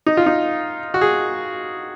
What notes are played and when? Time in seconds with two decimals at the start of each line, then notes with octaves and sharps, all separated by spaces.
0.06 D#4
0.17 F4
0.26 D#4
0.94 F#4
1.01 G#4